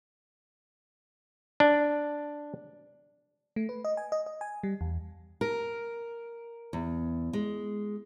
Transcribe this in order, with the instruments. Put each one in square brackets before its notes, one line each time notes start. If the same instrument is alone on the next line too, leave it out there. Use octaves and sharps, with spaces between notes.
[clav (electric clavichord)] D4
[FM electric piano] A3
B4
D#5
G#5
D#5
D#5
G#5
G3
E2
[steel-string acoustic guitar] A#4
E2
G#3